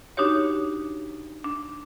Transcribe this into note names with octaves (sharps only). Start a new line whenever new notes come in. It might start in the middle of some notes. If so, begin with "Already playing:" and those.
D4 D#4 F#4 G4 C#5
D4